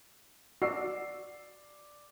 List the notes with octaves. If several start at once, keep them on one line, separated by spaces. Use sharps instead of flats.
F#4 D5 E6 C7